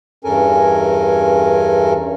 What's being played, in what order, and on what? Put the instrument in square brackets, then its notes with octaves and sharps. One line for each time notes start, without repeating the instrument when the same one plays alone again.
[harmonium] E2 G2 C#4 A4 A#4 G#5